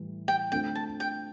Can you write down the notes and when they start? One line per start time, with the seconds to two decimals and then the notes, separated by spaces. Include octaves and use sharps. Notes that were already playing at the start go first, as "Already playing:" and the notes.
Already playing: A2 E3 G3
0.28 G5
0.52 D3 A3 C4 F4 G5
0.75 A5
1.00 G5